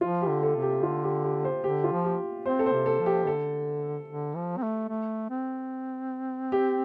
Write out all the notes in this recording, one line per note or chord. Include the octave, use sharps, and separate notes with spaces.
F3 F4
G4
D3
A4
C3
G4
D3 F4
G4
G4
C5
D3 G4
F4
F3
G4
C4 C5
A4
C5
C3
A4
F3
G4
D3 A4
D3
F3
C4
A3
A3
C4
G4